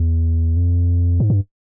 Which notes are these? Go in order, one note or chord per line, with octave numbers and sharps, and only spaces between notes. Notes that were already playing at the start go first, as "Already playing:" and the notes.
Already playing: E2
F2
G#2
G2